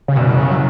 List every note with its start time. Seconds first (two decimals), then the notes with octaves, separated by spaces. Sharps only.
0.08 C#3
0.16 F#1 F#2 B2 E3 G3
0.37 C#3
0.51 F#3